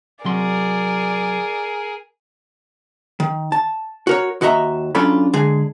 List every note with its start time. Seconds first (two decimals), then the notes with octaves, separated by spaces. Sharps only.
0.25 C3 F#3 G#4 A#4 D5 C6
3.20 D#3
3.52 A5
4.07 F#4 A#4 C#5
4.41 D#2 F#4 D#5 E5 A#5
4.95 F#3 C#4 D4 F4 A4 B5
5.33 D3 G#3 G#4